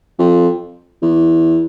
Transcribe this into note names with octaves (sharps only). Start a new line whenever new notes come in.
F2
E2